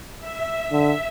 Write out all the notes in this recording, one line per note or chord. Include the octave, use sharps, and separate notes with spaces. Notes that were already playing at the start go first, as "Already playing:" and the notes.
E5
D3